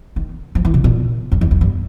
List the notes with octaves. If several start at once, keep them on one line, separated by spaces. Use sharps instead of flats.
D#3
F3
E3
B2
A#2
F2
E2
F2
G2